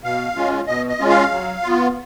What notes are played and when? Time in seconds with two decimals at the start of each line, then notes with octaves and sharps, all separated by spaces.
0.03 B2 F5
0.36 G#3 C#4 F4
0.67 B2 D#5
0.88 D#5
0.99 G#3 C#4 F4
1.09 F5
1.31 F#3
1.62 B3 F4